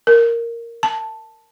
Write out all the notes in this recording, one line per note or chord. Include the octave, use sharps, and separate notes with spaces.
A#4
A5